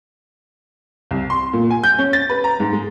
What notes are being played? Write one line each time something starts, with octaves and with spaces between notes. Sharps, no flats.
C2
C6
A#2
G#5
G6
C#4
A6
B4
A#5
G#2
G#3